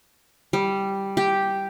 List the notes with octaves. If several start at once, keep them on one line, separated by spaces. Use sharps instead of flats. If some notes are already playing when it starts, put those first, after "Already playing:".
G3
G4